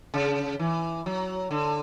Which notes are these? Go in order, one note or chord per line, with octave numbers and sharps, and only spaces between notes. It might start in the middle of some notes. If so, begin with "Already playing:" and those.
C#3
E3
F#3
D3